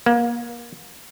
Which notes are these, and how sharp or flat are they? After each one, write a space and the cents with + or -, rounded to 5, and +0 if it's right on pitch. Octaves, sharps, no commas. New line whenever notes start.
A#3 +30